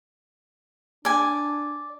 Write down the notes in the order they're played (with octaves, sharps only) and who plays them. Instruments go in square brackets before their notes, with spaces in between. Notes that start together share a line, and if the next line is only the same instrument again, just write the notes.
[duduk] D4 [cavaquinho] D5 G#5